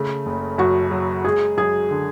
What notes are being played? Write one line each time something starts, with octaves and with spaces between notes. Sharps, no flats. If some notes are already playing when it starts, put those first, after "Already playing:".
Already playing: C#3 A3
F#1
F#2 F#4
F#3
G#3 G#4
F#2 G#4
D3